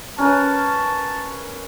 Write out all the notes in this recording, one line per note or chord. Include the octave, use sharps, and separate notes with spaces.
C#4 A#4 B4 A5